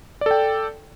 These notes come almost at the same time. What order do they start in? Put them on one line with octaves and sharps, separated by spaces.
D5 A4 G5